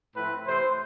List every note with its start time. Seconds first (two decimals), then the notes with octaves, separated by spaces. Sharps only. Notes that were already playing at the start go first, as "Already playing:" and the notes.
0.16 A2 F3 A3 C4 B4
0.46 C3 E3 A3 C4 C5